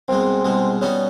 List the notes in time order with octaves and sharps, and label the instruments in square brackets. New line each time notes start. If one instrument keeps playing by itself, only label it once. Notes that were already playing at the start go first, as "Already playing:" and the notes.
[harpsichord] C2 B2 G#3 [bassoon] C4
[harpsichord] C2 B2 G#3
[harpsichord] B2 G3 B3 D#4 [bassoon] C#4